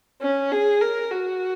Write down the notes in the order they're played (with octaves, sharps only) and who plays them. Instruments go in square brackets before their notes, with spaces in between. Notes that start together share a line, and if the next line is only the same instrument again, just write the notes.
[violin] C#4
G#4
A#4
F#4